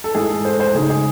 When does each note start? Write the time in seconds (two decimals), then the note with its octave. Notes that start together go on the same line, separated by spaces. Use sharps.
0.04 A4
0.14 G#2 E3 G#3 G#4
0.30 A4
0.45 C5
0.60 C5
0.75 C#3 G#3 D#4 G#4
0.90 G#4